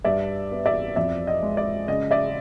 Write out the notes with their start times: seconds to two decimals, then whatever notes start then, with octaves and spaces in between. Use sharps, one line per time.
0.04 G2 D5 E5
0.51 B3
0.66 D5 E5
0.96 F2 D5 E5
1.27 D#5
1.43 G#3
1.57 D5
1.88 C#3 D#5
2.11 D5 E5